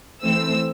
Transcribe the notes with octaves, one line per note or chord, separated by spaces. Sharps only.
E3 A3 C4 E6